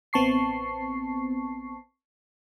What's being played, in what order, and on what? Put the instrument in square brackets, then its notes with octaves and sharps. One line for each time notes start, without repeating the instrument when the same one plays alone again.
[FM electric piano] A1 B3 C4 A5 C#6 C7